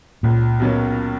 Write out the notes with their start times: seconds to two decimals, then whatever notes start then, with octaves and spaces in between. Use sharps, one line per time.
0.23 C#2 A#2
0.60 B2 F#3 A#3 C#4